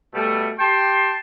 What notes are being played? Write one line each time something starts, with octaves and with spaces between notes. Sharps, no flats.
B2 G3 A3
G4 G5 A5 C6